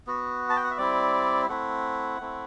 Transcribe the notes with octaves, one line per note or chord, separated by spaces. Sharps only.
B3 F#4
A5
G5
F#5
E5
G3 C4 E4 D5
A3 C4 E4 F#5
A3 C4 E4